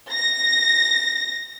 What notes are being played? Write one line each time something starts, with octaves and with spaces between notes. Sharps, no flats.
A#6